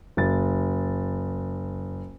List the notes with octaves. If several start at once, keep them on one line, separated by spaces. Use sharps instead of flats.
F#1 A6